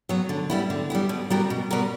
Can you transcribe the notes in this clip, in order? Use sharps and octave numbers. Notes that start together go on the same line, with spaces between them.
F#3 B3
D3
G3 B3 E4
D3
G3 B3 E4
B2
G3 B3 F#4 A#4
B2
G3 B3 F#4 A#4